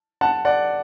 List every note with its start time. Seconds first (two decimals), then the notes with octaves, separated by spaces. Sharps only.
0.21 F#5 A5
0.45 D5 F#5